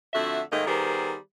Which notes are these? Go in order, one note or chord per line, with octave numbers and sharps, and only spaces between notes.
F2 D3 A3 F#4 E5
G#2 D#3 A3 A#3 D#5
D#3 G3 B3 G#4 A#4 C5